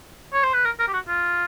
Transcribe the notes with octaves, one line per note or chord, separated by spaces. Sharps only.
C#5
C5
B4
A#4
A#4
G4
F#4
F4